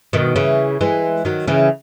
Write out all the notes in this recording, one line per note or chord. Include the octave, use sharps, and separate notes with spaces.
B2 D#3
C#3 E3
E3 G#3
D#3 F#3
C#3 E3